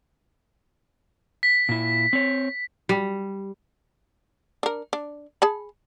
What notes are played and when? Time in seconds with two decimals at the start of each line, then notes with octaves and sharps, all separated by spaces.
1.43 B6
1.69 A#2 E4
2.13 C4 C#5
2.89 G3
4.63 D4 A#4
4.93 D4
5.42 G#4 A5 B5